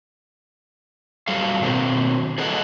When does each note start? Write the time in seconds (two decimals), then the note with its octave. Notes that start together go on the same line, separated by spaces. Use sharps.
1.27 F#2 F#3 G3 A4 F5
1.62 B2 D#3 F#3 C4
2.38 G#4 A4 B4 D#5 F#5